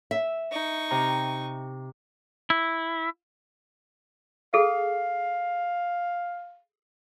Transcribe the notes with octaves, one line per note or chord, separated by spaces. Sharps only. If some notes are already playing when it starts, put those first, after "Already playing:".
E5
D#4 C#6
C3 A#5
E4
G#4 A4 F5